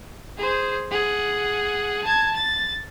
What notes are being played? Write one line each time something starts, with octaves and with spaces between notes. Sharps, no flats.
G#4 C5
G#4 F#5
A5 G#6
A6